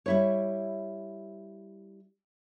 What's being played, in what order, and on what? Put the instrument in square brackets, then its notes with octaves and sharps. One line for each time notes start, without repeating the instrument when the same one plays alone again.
[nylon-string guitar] G3 E4 C#5